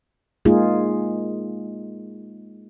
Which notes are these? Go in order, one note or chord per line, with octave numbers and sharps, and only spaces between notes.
G#3 A#3 D#4 F4 G#4